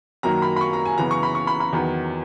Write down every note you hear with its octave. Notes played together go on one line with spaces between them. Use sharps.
F#2 D#3 F#3 A#3 A#5
B5
B5
C#6
A#5
G#5
F#2 C#3 E3 B3 A#5
C#6
B5
C#6
B5
B5
E2 D#3 F#3 B3